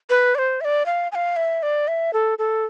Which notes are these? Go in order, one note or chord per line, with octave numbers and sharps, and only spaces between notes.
B4
D5
C5
E5
D5
F5
G#5
F5
E5
D5
E5
A4
A4